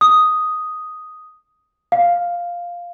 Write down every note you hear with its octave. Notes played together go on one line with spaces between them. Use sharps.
D#6
F5